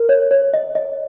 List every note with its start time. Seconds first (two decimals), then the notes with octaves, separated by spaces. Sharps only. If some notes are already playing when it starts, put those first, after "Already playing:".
Already playing: A#4
0.09 C#5
0.31 C#5
0.54 D#5
0.75 D#5